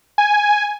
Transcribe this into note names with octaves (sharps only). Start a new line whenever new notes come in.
G#5